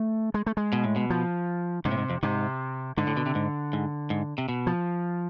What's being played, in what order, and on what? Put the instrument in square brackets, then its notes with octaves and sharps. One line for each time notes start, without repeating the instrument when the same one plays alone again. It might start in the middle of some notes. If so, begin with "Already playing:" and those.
Already playing: [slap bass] A3
G#3
A3
G#3
[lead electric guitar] B2
A2
B2
[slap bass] F3
[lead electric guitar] G#2 [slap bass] C3
[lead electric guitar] A2
G#2
F2
[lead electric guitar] G#2 [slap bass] C3
[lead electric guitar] G#2 [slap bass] D3
[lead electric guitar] A2
B2
C3
G#2
G#2
G#2
C3
B2
[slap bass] F3